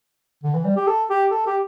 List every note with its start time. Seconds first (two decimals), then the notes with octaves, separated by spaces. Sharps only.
0.44 D3
0.54 E3
0.65 G3
0.76 G4
0.87 A4
1.10 G4
1.31 A4
1.47 G4